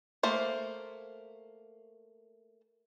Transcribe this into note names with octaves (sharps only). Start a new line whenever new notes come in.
A3 A#3 C5